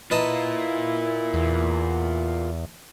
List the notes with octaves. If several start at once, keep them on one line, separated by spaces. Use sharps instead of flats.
E4 F4 A#4 B4 D#5 A5
E2